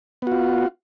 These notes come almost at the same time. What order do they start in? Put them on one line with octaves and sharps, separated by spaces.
B3 F#4 F4